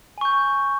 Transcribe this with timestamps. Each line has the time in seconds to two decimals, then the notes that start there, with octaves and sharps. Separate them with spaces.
0.18 G#5
0.21 C#6
0.25 G6